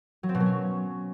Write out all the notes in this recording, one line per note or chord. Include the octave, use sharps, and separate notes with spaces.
F#3
C4
B2
F#3
C#4